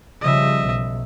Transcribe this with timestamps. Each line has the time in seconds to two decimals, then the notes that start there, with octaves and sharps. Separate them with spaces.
0.21 C#3 F3 G3 D#5 E5
0.61 B1